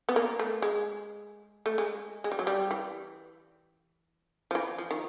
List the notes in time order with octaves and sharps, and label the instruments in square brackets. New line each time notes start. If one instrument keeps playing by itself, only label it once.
[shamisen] B3
A#3
A3
G#3
A3
G#3
G#3
G3
F#3
G3
E3
F3
E3
F3
D#3